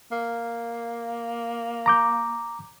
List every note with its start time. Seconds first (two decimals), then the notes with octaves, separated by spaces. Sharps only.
0.11 A#3
1.86 A#5 D6 G6